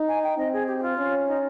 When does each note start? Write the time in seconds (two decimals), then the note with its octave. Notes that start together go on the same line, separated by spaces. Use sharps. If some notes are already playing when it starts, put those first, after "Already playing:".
Already playing: D#4
0.08 G#5
0.23 G5
0.38 C4 D#5
0.53 G#4
0.67 G4
0.78 G4
0.82 F4
0.98 C#4
1.27 D#4